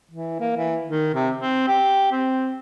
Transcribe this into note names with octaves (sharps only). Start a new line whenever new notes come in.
E3
A#3
E3
D#3
C3
C4
G4
C4